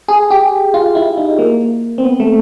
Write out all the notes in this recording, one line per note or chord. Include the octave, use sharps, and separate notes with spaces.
G#4
G4
F4
E4
D#4
A#3
C4
B3
A3